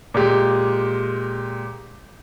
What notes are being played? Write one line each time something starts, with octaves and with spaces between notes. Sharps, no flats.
A#2 G#3 G4